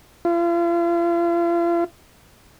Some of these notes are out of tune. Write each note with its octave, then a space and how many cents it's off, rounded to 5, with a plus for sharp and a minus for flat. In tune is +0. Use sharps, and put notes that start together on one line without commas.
F4 -40